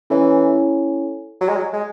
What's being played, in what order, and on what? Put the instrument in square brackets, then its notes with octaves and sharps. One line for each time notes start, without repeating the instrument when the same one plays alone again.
[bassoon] E3 [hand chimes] C#4 E4 A4 C#5 G#5
[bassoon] F#3
G#3
F#3
G#3